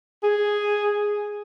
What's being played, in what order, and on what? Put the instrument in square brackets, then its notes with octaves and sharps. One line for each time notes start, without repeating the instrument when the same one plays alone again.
[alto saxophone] G#4